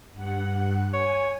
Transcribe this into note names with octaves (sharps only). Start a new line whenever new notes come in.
G2 F#5
C#5 G#5